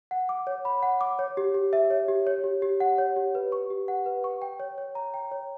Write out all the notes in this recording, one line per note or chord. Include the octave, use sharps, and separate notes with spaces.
F#5
D6
C#5
B5
F#5
D6
C#5
G4
G4
E5
C#5
G4
C#5
G4
G4
F#5
C#5
G4
B4
C#6
G4
F#5
B4
C#6
G5
C#5
C#5
A#5
G5
C#5